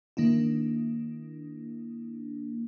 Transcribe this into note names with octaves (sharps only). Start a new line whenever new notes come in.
D#3 A#3 D4 E4